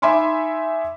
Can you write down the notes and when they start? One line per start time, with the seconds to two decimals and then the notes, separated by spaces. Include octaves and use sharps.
0.02 D#4 E5 G#5 B5 C6 D6